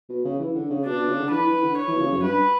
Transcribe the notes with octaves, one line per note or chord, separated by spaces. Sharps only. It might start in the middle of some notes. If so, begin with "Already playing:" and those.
B2
C#3
E3
D3
C#3
B2 D4
B2
C#3
D3
E3 B4
E3
D3
C#5
E3
B2
C#3
F#2
G2 B4